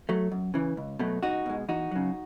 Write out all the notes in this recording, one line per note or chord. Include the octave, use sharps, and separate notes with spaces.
F#3 A3
F#2
C#3 E3
C#2
B2 F#3 A3
C#2 D#4 F#4
B2 G#3
E2 D#4 F#4
C#3 F#3